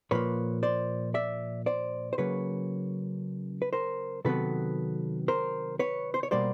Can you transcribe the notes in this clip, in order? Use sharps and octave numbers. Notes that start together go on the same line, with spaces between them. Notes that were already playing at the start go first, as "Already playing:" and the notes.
A#2 F3 A#3 B4 C#5
C5 D5
D5 E5
C5 D5
C5
C#3 F#3 A#3 B4 C#5
B4
A#4 C5
C3 D#3 F#3 B3 A4 B4
A#4 C5
B4 C#5
C5
C#5
B2 G3 A#3 C5 D5